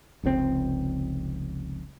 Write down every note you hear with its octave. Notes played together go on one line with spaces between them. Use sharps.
F1 C#2 A#2 C4